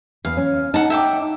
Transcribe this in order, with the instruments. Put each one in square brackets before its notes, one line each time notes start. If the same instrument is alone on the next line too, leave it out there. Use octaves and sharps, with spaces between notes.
[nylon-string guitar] E2 [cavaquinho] F5
[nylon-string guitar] C#4
[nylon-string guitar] D#4 [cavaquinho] F#5 A5
[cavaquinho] E5 G5 D6